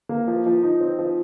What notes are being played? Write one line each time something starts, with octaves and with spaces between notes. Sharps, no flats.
A#3
F3
F3
D#4
C4
F3